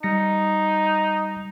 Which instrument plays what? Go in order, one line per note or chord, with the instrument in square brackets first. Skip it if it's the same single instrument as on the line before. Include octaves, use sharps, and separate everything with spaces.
[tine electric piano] G3 A#6 C#7 [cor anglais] D#4